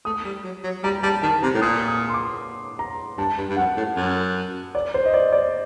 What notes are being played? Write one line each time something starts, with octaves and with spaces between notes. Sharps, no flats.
A3 D#6
G3
F#3
F#3
G3 A#5
G3 A5
D#3 A5
C3 A#5
A2
A#2 D#6
D#6
C6
D6
A#5
G2 A5
G2
G2
F#2 F#5
A2
F#2
D5
C5
D#5
D5
D5